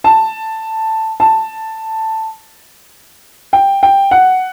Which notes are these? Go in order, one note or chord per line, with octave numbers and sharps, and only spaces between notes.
A5
A5
G5
G5
F#5